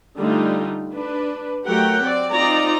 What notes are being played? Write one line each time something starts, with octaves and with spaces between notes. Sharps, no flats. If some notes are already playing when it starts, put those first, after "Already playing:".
D3 G3 A3 D#4 F4
D4 B4
F#3 A3 G4 A#4 F#5 G5
C4 D5
C4 D#4 F4 D5 A#5